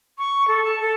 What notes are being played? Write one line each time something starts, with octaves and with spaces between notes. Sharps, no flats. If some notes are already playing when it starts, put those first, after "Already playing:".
C#6
A4
A5
A4